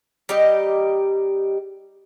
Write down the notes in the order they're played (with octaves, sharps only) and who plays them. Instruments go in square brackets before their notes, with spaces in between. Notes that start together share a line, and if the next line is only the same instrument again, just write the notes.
[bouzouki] G3 D#4 G4 D#5